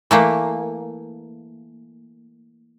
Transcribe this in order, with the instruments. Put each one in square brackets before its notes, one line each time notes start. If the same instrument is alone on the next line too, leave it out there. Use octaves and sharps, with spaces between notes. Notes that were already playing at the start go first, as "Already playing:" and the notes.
[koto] E3 A3 A#3